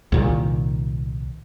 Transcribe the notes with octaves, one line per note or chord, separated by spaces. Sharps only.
C2 A#2 D#3